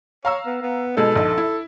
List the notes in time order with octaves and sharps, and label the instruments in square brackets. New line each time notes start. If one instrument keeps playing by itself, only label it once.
[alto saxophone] C#5 [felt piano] F5 A#5 E6
[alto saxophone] B3
B3
[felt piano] B2 G#3 D#4 [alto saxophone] A4
[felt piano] A#1 D#4
E4